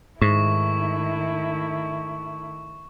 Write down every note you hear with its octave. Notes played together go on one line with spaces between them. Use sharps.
G#2 D#3 A3 E4 C#6